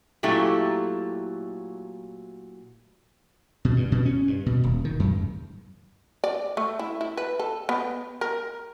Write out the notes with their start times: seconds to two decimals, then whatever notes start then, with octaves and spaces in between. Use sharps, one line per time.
0.23 A#2 F#3 A3 E4 G4
3.65 B2
3.77 G2
3.92 B2
4.05 C#4
4.28 G2
4.46 B2
4.64 D#1
4.85 D#3
5.00 F#2
6.24 D5
6.57 A3
6.79 E4
7.01 E4
7.17 B4
7.39 A4
7.69 B3
8.21 A#4